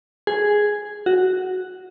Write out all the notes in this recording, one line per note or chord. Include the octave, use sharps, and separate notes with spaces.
G#4
F#4